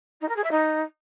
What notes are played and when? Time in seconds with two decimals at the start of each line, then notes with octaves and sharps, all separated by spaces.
0.21 D#4
0.28 A#4
0.36 G#4
0.43 E5
0.51 D#4